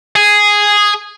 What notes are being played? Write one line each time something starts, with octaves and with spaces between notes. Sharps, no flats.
G#4